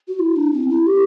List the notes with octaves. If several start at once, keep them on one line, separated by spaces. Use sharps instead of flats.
F#4
E4
D4
C4
E4
G4